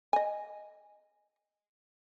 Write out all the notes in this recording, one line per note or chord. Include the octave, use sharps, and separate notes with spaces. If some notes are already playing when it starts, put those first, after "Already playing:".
D#5 G#5